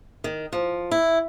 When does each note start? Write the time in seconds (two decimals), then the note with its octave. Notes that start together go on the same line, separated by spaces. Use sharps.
0.24 D#3
0.53 F3
0.91 E4